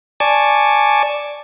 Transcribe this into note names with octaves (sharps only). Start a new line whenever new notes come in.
D5 G#5 A5 C#6 D6